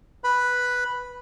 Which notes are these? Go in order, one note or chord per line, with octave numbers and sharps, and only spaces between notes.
B4 B5